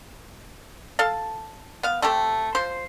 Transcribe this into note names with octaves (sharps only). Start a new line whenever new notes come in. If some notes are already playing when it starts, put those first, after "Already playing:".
A4 F5 A5
B3 F5
A3 C4 G4 A4
F3 C5